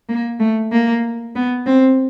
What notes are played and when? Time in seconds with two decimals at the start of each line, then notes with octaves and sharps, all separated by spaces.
0.09 A#3
0.40 A3
0.72 A#3
1.36 B3
1.66 C4